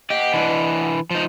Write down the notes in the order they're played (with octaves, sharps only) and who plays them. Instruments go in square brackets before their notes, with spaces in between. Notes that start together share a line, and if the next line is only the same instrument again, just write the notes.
[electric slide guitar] G4 [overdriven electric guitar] D#5 F#5
[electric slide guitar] E3 D4
F3 D#4